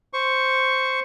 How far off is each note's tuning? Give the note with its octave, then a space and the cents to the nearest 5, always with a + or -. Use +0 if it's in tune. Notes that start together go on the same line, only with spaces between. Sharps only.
C5 +0 C#6 +0